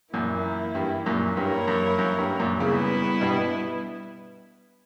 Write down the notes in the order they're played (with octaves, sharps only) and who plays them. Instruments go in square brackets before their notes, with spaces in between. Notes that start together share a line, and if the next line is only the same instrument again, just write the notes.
[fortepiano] F#2 A#2 [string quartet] E3 A#3 E4
[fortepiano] G2
F#2 A#2
[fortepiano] G2 [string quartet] A#3 E4 A#4 C#5
[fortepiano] F#2
F#2
G2
F#2 A#2
[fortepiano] A#2 C#3 [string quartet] G3 B3 E4 B4
[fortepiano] G2 B2